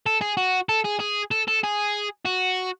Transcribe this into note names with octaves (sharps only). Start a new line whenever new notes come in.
A4
G#4
F#4
A4
G#4
G#4
A4
A4
G#4
F#4